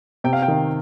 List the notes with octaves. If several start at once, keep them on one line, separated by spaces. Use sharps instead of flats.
C3 G5
F5
G5
D#3